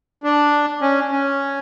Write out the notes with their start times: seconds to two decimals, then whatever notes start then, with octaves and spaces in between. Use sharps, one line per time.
0.24 D4
0.81 C#4
1.11 C#4